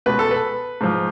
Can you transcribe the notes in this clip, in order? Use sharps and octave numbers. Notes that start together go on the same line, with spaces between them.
C#2 B2 B4
A4
B4
G#2 F3